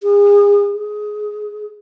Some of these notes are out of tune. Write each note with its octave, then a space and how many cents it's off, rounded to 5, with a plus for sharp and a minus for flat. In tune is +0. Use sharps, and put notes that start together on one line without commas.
G#4 -35
G#4 +15